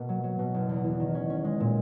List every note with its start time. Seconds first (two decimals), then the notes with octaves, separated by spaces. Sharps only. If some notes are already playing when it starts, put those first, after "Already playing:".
Already playing: B2 A#3
0.09 F#3
0.24 F#3
0.39 B2
0.54 F#1
0.69 E2
0.84 E2
1.00 D#3
1.15 C#4
1.30 C#4
1.45 G#3
1.60 A#2